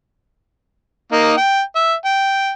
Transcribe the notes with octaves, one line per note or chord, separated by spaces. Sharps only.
A#3 D#4
G5
E5
G5